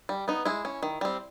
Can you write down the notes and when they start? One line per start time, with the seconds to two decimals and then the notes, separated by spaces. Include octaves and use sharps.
0.09 G3
0.28 B3 D#4
0.45 G#3 E4
0.65 C#4
0.83 D#3
1.01 G3 C4